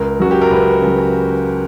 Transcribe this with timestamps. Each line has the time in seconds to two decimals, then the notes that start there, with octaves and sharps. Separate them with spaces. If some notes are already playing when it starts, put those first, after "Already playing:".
Already playing: C#2 A#4
0.20 C#3 F#3 F#4
0.31 G4
0.41 A#4
0.51 C#2 B4
0.82 C#3
0.87 F#3